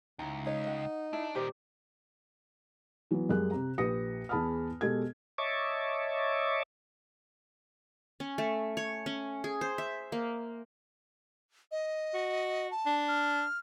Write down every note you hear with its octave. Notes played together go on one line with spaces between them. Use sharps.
C#2 D#4 E4
D#4 C#5
F#5
D4 E4
A#2 D#3 G4 C5 D5
E3 F#3 B3
F#2 G3 G#3 G#4 A#4 F#6
C3 A#5
A#1 G4 B4 D#6 A#6 C#7
E2 G#4 A5 B5 D#6 F6
B2 G#3 G4 A4 G#6
C#5 D#5 E5 A5 C#6 D6
C#4
A3
C#5
C#4
G#4
C5
E5
A#3
D#5
F#4
A5
D4
F6